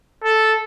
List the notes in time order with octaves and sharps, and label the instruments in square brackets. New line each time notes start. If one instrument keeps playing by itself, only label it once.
[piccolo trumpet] A4